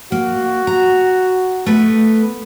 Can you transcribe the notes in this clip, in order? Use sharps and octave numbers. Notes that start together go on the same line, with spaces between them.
A#3 F#4
A#5
A3 B3 B4